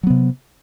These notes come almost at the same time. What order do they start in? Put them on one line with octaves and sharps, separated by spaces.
F#3 B3 C3